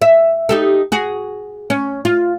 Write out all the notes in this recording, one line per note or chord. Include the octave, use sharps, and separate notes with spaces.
E5
D#4 G4 A4
F#4 G#4
C#4
F4